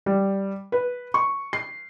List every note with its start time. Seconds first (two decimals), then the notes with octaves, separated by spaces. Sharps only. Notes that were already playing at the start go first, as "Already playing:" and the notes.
0.06 G3
0.72 B4
1.14 C#6
1.53 C7